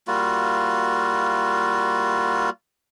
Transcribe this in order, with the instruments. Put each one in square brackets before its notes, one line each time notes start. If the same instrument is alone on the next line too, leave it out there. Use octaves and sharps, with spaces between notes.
[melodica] G3 A#3 F4 F#4